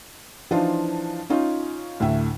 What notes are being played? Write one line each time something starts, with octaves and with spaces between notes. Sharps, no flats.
E3 F3 D4 D#4 F4
C#4 D#4 F4
D2 A2 E5